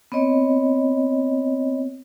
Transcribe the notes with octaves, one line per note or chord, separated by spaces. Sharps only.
B3 C4 C#5 D#5